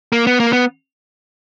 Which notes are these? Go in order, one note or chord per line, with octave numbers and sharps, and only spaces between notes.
A#3
B3
A#3
B3